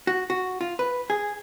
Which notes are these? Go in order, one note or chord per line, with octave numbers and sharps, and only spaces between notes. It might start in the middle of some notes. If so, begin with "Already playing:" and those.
F#4
F#4
F4
B4
G#4